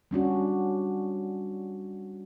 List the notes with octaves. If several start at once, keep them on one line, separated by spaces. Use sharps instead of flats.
G3 C#4 D4 F#4